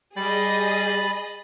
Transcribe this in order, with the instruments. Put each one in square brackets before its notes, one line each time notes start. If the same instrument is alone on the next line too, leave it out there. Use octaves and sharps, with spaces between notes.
[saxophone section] G3 [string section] G#4 D#5 [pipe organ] B5 A6